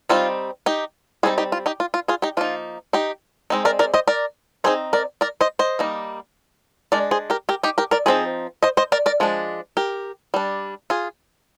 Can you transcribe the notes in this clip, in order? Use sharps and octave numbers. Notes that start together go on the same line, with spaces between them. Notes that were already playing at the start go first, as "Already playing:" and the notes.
G3 C4 D#4 F4
D#4 G4
G3 C4 D#4 F4 G#4
D#4 G4
F4
D#4 G4
F4
F4
F4 G#4
D#4 G4
F3 A#3 D#4 F4
D#4 G4
G#3 C4 D#4
A#4 D5
A#4 D5
C5 D#5
A#4 D5
G3 C4 D#4 G#4 C5
A#4 D5
A#4 D5
C5 D#5
C5 D#5
G3 A#3 D#4
G#3 D4 A#4 D5
G#4 C5
G4 A#4
G4 A#4
D#4 G4
G4 A#4
A#4 D5
F3 C4 D#4 G#4 C5
C5 D#5
C5 D#5
A#4 D5
A#4 D5
F3 G#3 D4
G4 A#4
G3 D4
F4 G#4